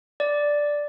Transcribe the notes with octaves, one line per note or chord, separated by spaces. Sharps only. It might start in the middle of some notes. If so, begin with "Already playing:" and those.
D5